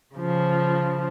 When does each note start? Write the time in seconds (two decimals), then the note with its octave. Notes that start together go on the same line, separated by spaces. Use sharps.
0.15 C#3 F3